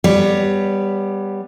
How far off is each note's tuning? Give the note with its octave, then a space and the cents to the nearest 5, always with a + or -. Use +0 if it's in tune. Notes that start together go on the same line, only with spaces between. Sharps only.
G3 +10 B3 +0 C#5 +25